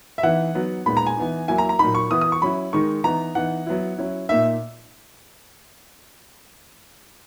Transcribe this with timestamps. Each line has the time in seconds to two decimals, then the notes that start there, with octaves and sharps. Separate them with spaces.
0.18 E5
0.23 E3 B3 D#4 F#5
0.55 F#3 B3 D#4
0.86 A#2 G#3 B3 D#4 B5
0.97 A#5
1.06 G#5
1.17 E3 B3 D#4
1.48 F#3 A#3 E4 G#5
1.58 A#5
1.69 A#5
1.79 A#2 F#3 A#3 D#4 B5
1.95 C#6
2.10 E3 B3 E4 D#6
2.21 D#6
2.32 C#6
2.42 F#3 C#4 E4 B5
2.73 D#3 G#3 D#4 C#6
3.04 E3 B3 D#4 A#5
3.35 E3 B3 D#4 F#5
3.67 F#3 B3 E4
3.98 F#3 C#4 E4
4.29 A#2 A#3 D#4 E5